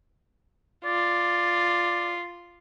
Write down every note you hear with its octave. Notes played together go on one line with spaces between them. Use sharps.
F4 D5